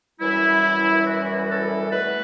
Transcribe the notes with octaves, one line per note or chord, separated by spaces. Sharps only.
F#2 E3 G3 E4
F#4
A4
E2 B2 A3 B4